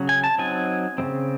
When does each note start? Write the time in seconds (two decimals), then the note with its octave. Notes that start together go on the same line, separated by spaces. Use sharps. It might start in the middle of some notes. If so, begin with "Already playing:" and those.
Already playing: C#3 F#3 C#4
0.09 G#5
0.24 A5
0.38 F#3 C4 D#4 G#5
0.98 C#3 G#3 C4